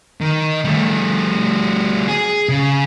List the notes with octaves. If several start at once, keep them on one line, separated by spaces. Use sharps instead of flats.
D#3
G3 A3
G#4
C#3